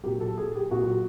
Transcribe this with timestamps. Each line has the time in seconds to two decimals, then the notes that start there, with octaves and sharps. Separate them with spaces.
0.03 A#2 F#3 G4
0.20 A4
0.38 G#4
0.55 G4
0.71 A#2 F#3 F#4